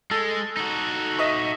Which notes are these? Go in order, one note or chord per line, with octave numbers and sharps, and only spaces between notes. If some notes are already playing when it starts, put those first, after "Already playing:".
G#3 A4
D#4 F#4
D#5 E5 C#6